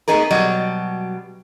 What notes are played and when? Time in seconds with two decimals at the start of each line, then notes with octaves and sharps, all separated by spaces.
0.08 A3 B3 D#4 G#4 A#4
0.31 B2 F#3 G3 D#5